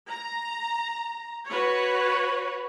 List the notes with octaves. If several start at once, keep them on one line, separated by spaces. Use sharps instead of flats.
A#5
F#4 B4 C#5